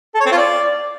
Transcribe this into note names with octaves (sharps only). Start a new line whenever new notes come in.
A4
C#5
C4
F4
D5